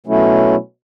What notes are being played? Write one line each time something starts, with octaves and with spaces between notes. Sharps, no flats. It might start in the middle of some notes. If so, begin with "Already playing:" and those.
B2 F#3 A3 C#4 E4